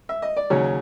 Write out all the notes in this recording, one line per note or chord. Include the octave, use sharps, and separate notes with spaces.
E5
D#5
D5
D#2 C#3 F#3 C#5